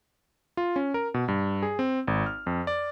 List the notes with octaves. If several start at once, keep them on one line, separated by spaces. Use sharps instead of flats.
F4
C#4
A#4
B2
G2
G#4
C4
G#1
F6
F2
D5